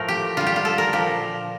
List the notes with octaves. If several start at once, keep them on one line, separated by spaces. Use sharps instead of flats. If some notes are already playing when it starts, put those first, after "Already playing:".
Already playing: A2 F3 A3 A#4
G4
D3 G3 F4
G4
F4
A4
A#4
A#2 F3 G4